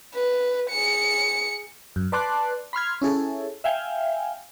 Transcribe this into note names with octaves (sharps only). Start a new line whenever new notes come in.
B4
G#4 C#7
F#2
B4 D5 A5 C6 D6 F#6
B5 C6 F6 G#6
C#4 E4 G#4 A4
E5 F5 G5 G#5